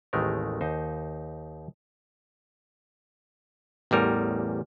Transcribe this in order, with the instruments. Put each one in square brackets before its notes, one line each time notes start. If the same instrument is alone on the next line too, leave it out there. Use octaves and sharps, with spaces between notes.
[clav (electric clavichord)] A1 D#2 D#3 G#3 A3 A#4
D#2 D#4 C5
A1 E2 G3 A#4